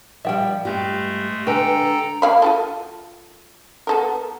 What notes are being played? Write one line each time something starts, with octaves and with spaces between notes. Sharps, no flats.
F3 G3 E5 G5
G2 G#3 A3 G4
D3 G#3 D4 G4 A4 B4 G5 A#5
A#3 F5 B5
F4 F#4 A4
B3 A4 A#4